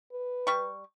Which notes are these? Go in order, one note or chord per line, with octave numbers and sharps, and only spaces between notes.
B4
G3 C#6